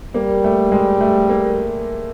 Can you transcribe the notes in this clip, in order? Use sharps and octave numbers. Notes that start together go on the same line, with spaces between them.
G3 A#3
A3
G#3
A3
A#3